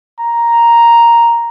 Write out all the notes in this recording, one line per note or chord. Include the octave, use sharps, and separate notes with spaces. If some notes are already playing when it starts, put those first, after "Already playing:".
A#5